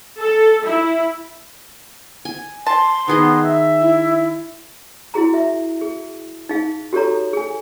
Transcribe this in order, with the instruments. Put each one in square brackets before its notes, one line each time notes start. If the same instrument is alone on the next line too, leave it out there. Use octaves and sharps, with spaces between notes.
[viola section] A4
E4
[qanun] G#5
[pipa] A5 [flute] C6
[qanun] D#3 G#4 D#5 [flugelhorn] B3
[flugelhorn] E5
[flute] E4
[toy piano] E4 F#4 G#4 A#5
E5
G#4
D#4 G#4 F5
F#4 G4 A4 C#5 A#5
G#4 G#5